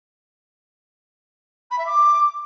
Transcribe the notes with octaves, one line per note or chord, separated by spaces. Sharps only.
B5
E5
D6